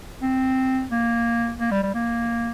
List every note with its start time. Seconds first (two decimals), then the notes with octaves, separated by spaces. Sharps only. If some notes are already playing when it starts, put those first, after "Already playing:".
0.23 C4
0.92 A#3
1.60 A#3
1.71 G3
1.83 G3
1.95 A#3